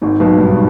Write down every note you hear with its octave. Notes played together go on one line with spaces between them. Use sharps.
G#1 G#2
B1 B2
G2